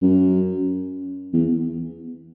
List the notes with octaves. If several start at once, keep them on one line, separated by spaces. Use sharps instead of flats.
F#2
E2